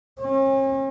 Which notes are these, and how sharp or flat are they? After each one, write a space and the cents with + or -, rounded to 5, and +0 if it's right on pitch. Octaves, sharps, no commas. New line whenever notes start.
C#4 -45